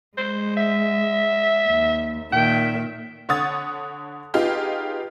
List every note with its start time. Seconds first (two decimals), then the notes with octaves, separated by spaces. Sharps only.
0.18 G#3 C5
0.57 E5
1.68 D#2
2.32 A#2 D#3 E5 G5
3.29 D3 C#5 F#5 D#6 A6
4.34 B3 D#4 F4 G4 G#4